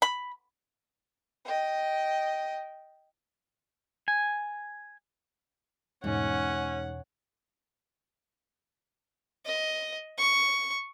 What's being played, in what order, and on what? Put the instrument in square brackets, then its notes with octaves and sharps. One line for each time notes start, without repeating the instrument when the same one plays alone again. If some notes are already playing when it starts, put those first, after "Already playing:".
[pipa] B5
[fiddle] D#5 G5
[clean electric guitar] G#5
[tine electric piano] E2 B2 [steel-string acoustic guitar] G#2 [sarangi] C#4 [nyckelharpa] F#5
[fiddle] D#5
C#6